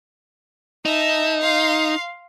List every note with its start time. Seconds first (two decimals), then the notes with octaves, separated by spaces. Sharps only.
0.86 D#4 E5 A5
1.41 F5 C6